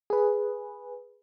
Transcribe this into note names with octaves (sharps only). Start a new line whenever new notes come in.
G#4 B4